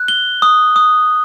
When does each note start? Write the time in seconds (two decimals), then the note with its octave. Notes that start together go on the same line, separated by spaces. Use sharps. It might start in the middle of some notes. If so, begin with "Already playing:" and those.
Already playing: F#6
0.08 G7
0.42 D#6
0.76 D#6